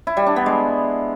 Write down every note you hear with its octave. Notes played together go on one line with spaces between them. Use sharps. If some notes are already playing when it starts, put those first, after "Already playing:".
E4
G3
D4
B3
G#3